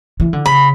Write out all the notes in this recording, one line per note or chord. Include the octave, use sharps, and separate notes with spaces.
E3
D3
C#3 B5